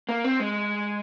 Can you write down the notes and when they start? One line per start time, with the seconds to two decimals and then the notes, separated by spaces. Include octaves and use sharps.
0.09 A#3
0.24 C4
0.40 G#3